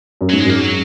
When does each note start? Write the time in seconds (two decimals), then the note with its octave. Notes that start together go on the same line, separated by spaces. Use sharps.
0.21 F#2
0.30 G#2 F#3
0.40 G#3
0.45 F#2 A#3
0.59 F#3